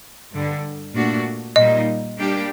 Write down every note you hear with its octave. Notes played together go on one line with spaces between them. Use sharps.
G2 D3 G3
A#2 A3 D4 F#4
A#2 G3 A#3 D#4 D#5
G3 A#3 D4 G4